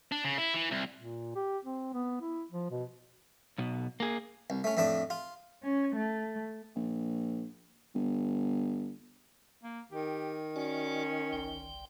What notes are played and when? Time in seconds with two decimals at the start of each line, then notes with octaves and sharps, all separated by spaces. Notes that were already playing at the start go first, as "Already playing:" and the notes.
0.12 D4
0.25 C#3
0.38 E4
0.54 E3
0.71 C2
0.97 A#2
1.35 G4
1.65 C4
1.93 B3
2.21 E4
2.51 F3
2.70 B2
3.58 B1 B2
4.00 A#3 G#4
4.50 C2
4.64 A3 C#4
4.77 F2 A2 A3 D4 A5
5.10 F4
5.63 C#4
5.95 A3
6.76 A#1
7.95 G1
9.63 A#3
9.92 D#3 G4
10.56 C#4 F#4 D5
11.33 G1 C2 G5